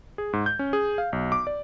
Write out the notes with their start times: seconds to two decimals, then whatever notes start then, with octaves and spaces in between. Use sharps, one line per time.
0.18 G#4
0.33 G#2
0.46 G6
0.59 C#4
0.73 G#4
0.98 F5
1.13 B1
1.32 D6
1.47 D5